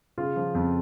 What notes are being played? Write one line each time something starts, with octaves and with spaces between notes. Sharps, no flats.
C#3 F4
F3
F2